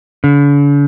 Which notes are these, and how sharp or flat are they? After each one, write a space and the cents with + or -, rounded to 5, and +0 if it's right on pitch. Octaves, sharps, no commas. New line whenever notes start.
D3 -45